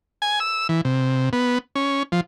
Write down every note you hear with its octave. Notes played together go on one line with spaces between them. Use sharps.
G#5
E6
E3
C3
B3
C#4
F3